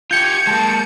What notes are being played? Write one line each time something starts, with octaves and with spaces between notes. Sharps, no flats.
F4 G4 G6 G#6 C#7
G#3 A#3 A5